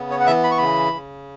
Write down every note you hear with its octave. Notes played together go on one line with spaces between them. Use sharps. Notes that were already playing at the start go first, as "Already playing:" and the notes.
Already playing: C#3 B3
C#5
F#5
E3 E5
B5
C#6
C#3 B5
C#3